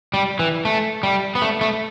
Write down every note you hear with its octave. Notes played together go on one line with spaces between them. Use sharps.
G3
E3
A3
G3
B3
A3
A3